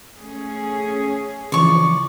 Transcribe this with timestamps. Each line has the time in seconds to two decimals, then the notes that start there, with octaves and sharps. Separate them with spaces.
0.18 A3 C#4 G#4
1.52 C#3 E3 F3 D5 C#6